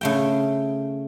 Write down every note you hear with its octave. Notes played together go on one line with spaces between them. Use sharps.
C#3 A3 G5